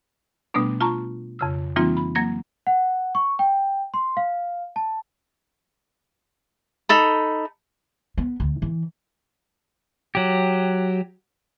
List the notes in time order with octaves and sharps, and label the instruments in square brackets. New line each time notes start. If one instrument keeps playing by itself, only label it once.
[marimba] B2 G3 A3 B3 D4
F4 A5 A#5 C#6
F2 C#3 E6
E3 G3 A#3 C4 D#4 F4
B5
F#3 A#3 G#6 A#6
[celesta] F#5
C#6
G5
C6
F5
A5
[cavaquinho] D#4 A4 B5
[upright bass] B3
D2
E3
[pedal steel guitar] F#3 G4